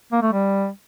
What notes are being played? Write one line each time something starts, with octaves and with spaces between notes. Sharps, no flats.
A#3
A3
G3